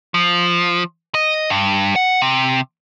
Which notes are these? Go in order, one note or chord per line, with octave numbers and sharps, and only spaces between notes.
F3
D#5
G2
F#5
C3